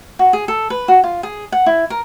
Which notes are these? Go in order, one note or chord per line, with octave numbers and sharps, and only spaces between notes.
F#4
G#4
A4
B4
F#4
F4
G#4
F#5
E4
A#4